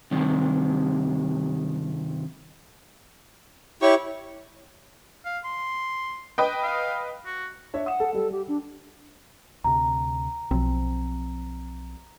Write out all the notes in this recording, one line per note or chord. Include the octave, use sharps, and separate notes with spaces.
G2 C3 D#3
E4 G4 C#5 C#6
F5
C6
B4 D#5 G5
F5
F#4
D4 C#5 E5
F#5 D#6 E7
A4
G3 A4
G4
D4
D2 C3 A#5
B1 F3 C4